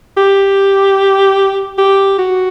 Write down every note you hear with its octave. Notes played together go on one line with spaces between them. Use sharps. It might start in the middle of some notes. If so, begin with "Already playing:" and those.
G4
G4
F#4